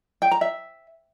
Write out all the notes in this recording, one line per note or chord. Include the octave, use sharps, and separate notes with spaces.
G5
A#5
E5